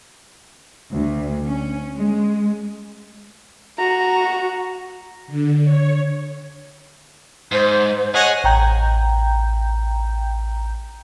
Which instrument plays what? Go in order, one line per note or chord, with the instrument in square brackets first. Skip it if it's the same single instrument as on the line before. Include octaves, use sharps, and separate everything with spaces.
[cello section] D2
C#4
G#3
[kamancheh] F#4 [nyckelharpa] A#5
[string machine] D3
C#5
[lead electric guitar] G#2 [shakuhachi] C5
[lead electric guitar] G#4 [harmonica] C#5 D#5 F#5
[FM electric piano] A1 G5 A#5 G6